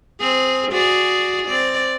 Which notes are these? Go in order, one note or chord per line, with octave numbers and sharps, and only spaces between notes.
C4 G#4
F#4 G#4 D5
C4 D5